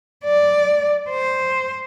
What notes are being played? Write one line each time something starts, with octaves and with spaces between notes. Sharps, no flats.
D5
C5